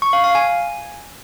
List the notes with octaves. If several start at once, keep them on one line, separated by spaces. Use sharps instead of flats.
C#6
F5
F5
G#5